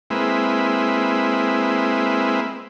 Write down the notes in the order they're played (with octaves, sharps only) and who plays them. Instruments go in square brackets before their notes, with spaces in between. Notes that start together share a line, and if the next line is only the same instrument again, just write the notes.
[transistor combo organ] G#3 A#3 C4 E4 B4